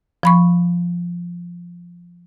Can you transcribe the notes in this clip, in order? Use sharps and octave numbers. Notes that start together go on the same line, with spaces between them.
F3 B5 C#6